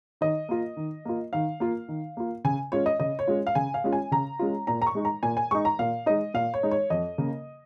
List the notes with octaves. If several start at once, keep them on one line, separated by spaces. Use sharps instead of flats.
D#3 D#5
A#3 F4
D#3
A#3 F4
D#3 F5
A#3 F4
D#3
A#3 F4
C#3 G#5
G#3 C#4 F4 C#5
D#5
C#3 D#5
C#5
G#3 C#4 F4
F5
C#3 G#5
F5
G#3 C#4 F4
G#5
C#3 A#5
G#3 C#4 F4
A#2 A#5
A#5
C#6
G#3 D#4
A#5
A#2 G#5
G#5
G#3 D#4 C#6
A#5
A#2 F5
G#3 D#4 D#5
A#2 F5
C#5
G#3 D#4
C#5
F2 D#5
C#3 A#3